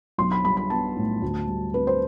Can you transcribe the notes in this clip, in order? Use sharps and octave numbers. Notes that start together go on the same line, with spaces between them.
B1 C6
B5
G3 B5
B5
B3 A5
A2
D2
G3
C4 B4
C5